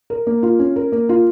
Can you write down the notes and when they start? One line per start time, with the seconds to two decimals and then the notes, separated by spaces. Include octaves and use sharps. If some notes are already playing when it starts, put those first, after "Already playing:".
0.10 A#4
0.27 A#3
0.43 F4
0.59 C#4
0.76 A#4
0.92 A#3
1.09 F4